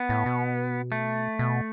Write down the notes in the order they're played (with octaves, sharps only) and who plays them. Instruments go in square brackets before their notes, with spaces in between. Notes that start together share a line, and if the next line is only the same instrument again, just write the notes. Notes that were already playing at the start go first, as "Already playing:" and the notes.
Already playing: [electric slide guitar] B3
[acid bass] A2
B2
[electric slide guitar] A3
[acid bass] B2